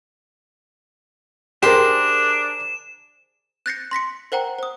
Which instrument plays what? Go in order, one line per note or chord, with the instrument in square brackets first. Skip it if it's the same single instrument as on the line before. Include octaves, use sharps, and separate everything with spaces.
[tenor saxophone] D4 [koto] G4 C5 [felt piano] G#4 A#4 [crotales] E7
[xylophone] F#6 G6 A6 A#6 C7 C#7
C6 A#6 B6 C#7
A#4 C5 F#5 G5 A#5
C5 D#6